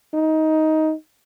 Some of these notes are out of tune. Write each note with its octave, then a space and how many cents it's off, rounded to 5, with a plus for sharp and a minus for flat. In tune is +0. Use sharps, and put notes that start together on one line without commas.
D#4 +15